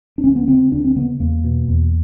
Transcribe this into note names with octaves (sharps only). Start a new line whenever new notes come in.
D4
D2 C#4
B3
C#3 C4
D2 D4
C4
C#3 B3
E2 A#3
B2
E2